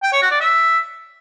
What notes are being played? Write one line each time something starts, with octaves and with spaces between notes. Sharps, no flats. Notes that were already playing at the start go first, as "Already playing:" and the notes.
G5
C#5
F#4
D5
E5